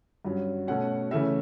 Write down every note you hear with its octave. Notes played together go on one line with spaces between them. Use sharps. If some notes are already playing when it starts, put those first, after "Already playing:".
G2 F#3 C#4
B2 A3 C#4 F#5
C#3 E3 A3 C#4 E5